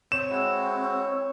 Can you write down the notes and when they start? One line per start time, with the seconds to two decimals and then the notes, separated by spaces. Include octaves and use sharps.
0.12 C4 C5 C#5 E7
0.30 G#3 E4 F#4